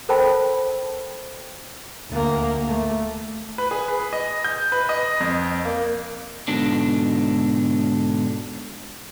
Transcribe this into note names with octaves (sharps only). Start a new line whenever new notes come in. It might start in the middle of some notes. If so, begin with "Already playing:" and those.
A4 A#4 C5 G5 A5 B5
D2 A#3
A3
B4
G#4
B4
D#5
G6
B4
D#5
F2
A#3
G#2 B2 D3 D4